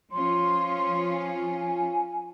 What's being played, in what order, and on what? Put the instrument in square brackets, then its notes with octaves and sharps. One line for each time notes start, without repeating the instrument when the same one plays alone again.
[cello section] F3 C#4 F4 [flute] C6
[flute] G#5